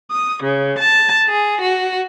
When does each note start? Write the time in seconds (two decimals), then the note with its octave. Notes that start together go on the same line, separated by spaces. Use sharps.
0.12 D#6
0.43 C#3
0.80 A5
1.29 G#4
1.60 F#4